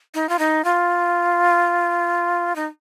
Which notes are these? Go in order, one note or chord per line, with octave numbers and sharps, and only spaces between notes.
D#4
F4
D#4
F4
D#4